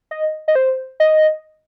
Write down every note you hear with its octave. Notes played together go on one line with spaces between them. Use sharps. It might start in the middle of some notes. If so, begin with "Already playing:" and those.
D#5
D#5
C5
D#5